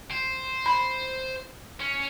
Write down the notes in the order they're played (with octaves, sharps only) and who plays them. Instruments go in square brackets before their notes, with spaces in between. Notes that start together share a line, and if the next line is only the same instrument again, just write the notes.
[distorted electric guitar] C5
[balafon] B5
[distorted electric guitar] C#4